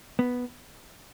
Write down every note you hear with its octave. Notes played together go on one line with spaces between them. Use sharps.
B3